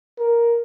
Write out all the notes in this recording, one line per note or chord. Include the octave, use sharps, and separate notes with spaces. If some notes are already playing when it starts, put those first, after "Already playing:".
A#4